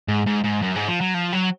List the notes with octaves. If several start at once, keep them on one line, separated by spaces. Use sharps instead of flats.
G#2
G#2
G#2
F#2
G#2
F3
F#3
F3
F#3